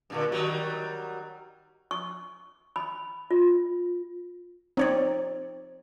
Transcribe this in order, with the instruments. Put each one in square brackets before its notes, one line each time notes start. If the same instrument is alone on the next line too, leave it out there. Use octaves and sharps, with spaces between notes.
[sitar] G2 A#2 D3
D#3 F#3 G3
[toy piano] C#6
B5
F4
[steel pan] C4 [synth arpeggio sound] D#4 C#5 D5